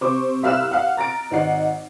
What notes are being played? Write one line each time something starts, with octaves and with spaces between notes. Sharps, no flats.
C3 C5 C#6 D6
C2 E5 F5 F6 F#6 E7
F5 F#5
A#5 A6 A#6 D7
G#1 D#4 F#5 C7